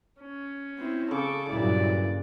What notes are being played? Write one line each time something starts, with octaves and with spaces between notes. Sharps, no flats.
C#4
C4 E4
C#3 A4 C#6 D6
G2 A#2 F#3 E4 D5